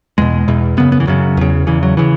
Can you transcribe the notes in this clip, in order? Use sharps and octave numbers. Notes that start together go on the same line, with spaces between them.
E2 B2 G#3
E2 B2
F#2 C#3 B3
B3
E3
F#2 C#3 F#3
E2 C#3
E2 C#3 E3
F#3
C#3 E3